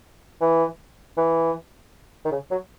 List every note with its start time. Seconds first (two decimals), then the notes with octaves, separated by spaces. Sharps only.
0.41 E3
1.17 E3
2.25 D#3
2.32 C#3
2.51 F#3